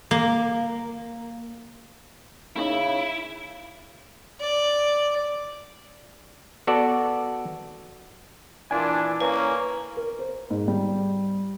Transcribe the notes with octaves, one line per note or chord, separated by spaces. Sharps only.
A#3
C#3 A#3 C#4 D#4 E4
D5
B3 F#4 A4 D5
A#2 E3 D4 E4 F4 D5 G#5
A#3 C#4 B4
A#4
C5
G#2
G3